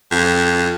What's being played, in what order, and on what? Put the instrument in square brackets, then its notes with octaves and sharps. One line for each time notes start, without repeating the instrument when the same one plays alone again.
[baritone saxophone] F2